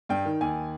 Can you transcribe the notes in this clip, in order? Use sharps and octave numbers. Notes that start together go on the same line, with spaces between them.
G2 G5
D#3
D#2 G#5